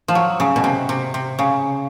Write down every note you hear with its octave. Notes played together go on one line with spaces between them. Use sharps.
F3
F#3
C#3
B2
C3
C3
C3
C#3